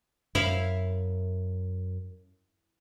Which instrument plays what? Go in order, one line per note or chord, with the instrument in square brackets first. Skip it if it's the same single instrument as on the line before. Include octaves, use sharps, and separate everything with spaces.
[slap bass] F#2 [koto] E4 E5 F5